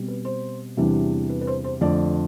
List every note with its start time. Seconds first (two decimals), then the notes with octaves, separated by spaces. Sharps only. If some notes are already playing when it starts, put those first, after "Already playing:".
Already playing: B2 G3 C4
0.08 B4
0.25 C5
0.77 E2 C3 E3 G3 D4
1.29 B4
1.41 B4
1.47 C5
1.64 C5
1.81 F2 D3 A3 D5